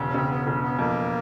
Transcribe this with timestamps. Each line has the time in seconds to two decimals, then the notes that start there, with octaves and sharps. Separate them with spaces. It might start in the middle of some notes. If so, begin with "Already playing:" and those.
Already playing: E1 C#3
0.09 C#4
0.14 C#3 C4
0.30 B3
0.47 E1
0.63 B3
0.78 F2 A#3